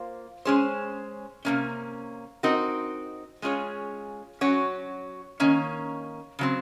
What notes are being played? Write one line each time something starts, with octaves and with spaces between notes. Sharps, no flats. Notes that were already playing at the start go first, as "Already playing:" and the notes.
Already playing: A#3 F4 C5
G#3 C#4 G#4 C5
C3 D#3 A#3 C#4
C4 D#4 F#4 A#4
G#3 C#4 F4 G#4 C#5
F#3 C#4 F#4 C#5
D#3 A#3 C#4
C#3 F#3 C4